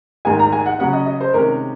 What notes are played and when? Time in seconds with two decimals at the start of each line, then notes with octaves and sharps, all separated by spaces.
0.25 G#2 D#3 G#3 G#5
0.39 A#5
0.52 G#5
0.66 F#5
0.79 C#3 F#3 C#4 F#5
0.93 D#5
1.06 D#5
1.21 C5
1.34 C3 D#3 G#3 C#4 A#4